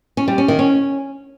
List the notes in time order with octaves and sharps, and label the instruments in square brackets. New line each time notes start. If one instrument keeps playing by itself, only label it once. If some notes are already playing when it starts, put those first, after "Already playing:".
[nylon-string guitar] C#4
G3
C#4
D#3
C#4